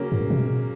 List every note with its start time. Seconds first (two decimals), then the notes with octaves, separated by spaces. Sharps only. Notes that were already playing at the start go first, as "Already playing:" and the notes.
Already playing: C#3 F#3 A#3 C#4
0.12 G2
0.30 C3
0.40 B2